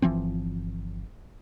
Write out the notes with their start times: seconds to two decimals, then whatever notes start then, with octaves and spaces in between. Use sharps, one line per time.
0.02 G1 E3 F3 C4